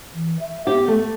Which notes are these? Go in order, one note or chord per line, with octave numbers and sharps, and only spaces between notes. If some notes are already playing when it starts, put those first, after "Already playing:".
E3
E5
B3 G4
A3